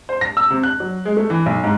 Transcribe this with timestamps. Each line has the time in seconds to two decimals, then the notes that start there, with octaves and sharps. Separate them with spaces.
0.09 C5
0.21 A#6
0.37 E6
0.50 C3
0.63 F#6
0.80 F#3
1.05 G#3
1.17 A3
1.30 E3
1.46 B1
1.63 G#2